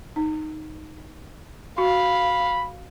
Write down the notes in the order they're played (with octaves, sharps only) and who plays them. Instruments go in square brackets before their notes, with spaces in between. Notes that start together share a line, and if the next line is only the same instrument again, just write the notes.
[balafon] D#4
[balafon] F#4 [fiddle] F5 [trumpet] B5